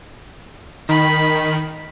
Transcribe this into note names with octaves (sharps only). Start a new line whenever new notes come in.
D#3 B5